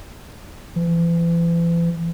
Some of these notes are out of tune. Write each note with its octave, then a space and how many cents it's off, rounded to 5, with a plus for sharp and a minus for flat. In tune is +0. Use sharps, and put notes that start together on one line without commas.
E3 +40